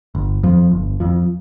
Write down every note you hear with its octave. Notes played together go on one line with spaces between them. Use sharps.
G1
F2 F3
G1
F2 F3